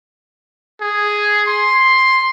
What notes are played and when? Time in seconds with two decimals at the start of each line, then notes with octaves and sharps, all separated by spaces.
0.81 G#4
1.47 C6